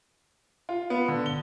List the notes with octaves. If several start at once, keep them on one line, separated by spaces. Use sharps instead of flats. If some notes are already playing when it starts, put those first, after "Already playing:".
F4
B3
D3
G7